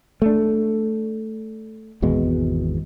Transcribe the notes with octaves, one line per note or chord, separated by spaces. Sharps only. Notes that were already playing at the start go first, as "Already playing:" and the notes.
A3 D4
G#1 E2 B2 G#3